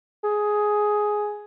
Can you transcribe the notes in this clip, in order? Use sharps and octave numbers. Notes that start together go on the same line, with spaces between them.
G#4